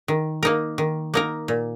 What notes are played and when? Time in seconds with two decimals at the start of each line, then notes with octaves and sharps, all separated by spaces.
0.08 D#3
0.43 A#3 D#4 A#4
0.78 D#3
1.14 A#3 D#4 A#4
1.48 A#2